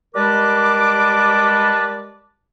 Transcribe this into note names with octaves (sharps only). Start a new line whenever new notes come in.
G3 G#3 A#4 B4 A5 D6